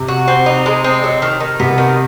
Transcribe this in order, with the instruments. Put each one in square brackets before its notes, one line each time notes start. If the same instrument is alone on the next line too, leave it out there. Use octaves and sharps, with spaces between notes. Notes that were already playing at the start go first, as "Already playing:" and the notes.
Already playing: [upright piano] C3
[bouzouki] F#4
C4
D#4
G#3
C4
F#3
D#3
D#3
[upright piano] C3 [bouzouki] B3
[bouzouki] D#3